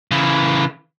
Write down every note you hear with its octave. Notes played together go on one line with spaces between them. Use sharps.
C#3 E3